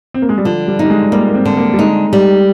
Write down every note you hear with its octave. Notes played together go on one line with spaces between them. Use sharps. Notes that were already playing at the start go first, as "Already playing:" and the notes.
C4
A#3
G#3
G3
D3 F3
G3
G3 D#4
G#3
G3 A#3
A#3
C4
D3
A#3
G3
G#3 D#4
G3